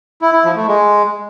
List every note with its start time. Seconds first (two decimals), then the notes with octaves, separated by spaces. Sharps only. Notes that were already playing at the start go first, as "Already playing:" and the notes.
0.22 E4
0.33 E4
0.45 F3
0.56 A3
0.67 G#3